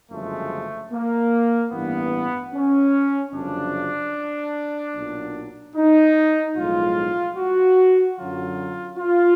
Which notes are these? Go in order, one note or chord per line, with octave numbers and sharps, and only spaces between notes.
G1 F#2 C#3 F3 G#3 A3
A#3
A1 G2 E3 B3
C#4
G1 F#2 C#3 F3 D4
B1 A#2 F#3
D#4
B1 A2 F3 G#3 F4
F#4
F#2 D3 F#3 F4
F4